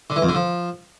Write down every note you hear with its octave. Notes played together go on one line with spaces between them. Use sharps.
D3
E3
F2
D3
F3